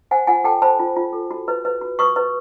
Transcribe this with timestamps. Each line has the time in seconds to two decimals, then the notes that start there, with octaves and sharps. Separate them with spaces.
0.11 C5 F#5 G#5
0.27 F4 F#5 G#5
0.44 A4 G5 A5
0.62 C5 A5 B5
0.80 F4
0.96 F4
1.13 A4
1.31 F#4
1.48 B4
1.65 B4
1.81 F#4
1.99 B4 C#6 D#6
2.16 B4